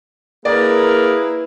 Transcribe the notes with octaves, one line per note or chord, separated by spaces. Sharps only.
A#3 E4 G#4 A#4 B4 D5